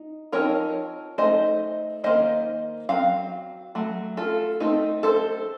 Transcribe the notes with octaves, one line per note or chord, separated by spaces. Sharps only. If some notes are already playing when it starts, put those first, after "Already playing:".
Already playing: D#4
F3 C4 D#4 A#4 C#5
A3 C4 D#4 C5 D#5
D#3 A#3 D#4 C5 D#5
F#3 C4 F5
F#3 A3
F4 A4
A3 C4 D#4
A4 C5